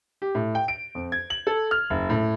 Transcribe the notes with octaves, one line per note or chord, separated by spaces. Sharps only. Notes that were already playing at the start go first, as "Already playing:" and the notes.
G4
A2
G5
D7
F2
G#6
F#7
A4
F6
F#1
A2